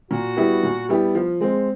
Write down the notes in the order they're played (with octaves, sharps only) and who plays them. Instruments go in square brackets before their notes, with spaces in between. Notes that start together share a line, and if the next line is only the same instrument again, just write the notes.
[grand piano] A#2 [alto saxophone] F#4
[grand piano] G3 B3 E4 G4
A#2
G3 B3 E4 G4
F3
G#3 C4